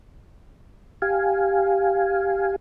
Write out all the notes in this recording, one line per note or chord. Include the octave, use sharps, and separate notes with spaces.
G4 F5 G#5